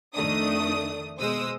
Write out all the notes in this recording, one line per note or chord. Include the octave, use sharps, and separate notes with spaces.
F2 D#3 A3 D4 D#6
B2 G#3 C5 D#6 E6